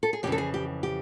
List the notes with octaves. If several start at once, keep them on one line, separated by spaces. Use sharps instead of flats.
A4
G#4
F2 C#3 E3 G4
A4
G#4
G4
G4